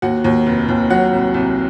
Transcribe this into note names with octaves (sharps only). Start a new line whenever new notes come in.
D#2 F#4 F#5
D#2
F1
D#2
F#3 F#4 F#5
C2
C2